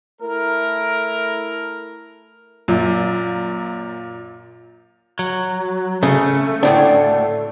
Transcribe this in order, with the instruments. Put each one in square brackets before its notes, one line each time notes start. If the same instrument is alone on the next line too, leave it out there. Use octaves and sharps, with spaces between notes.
[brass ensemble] A3 E4 A#4
[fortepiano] F#2 [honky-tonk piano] A#2
[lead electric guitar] F#3
[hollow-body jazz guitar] C#3 [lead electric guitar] A3
[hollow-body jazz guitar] D2 A2 D4